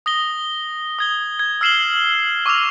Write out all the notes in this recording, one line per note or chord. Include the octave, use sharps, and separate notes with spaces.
D#6 A#6 G7
D#6 G#6 G7
G#6
E6 F6 C7 E7 F#7 G7
C#6 D6 E6 F6 F7